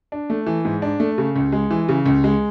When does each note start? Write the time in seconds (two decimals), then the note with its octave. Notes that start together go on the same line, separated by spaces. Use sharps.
0.12 D4
0.30 A3
0.46 E3
0.65 G#2
0.82 D4
1.00 A3
1.18 C#3
1.36 C#2
1.52 G#3
1.71 E3
1.89 C#3
2.06 C#2
2.24 G#3